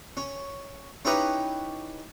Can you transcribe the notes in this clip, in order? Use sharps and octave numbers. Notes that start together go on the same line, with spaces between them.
C#4
C#4 D#4 E4 G4 B4 C#5